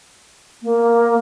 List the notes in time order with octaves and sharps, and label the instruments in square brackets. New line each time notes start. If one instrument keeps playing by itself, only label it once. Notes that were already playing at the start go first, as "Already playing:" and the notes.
[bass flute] A#3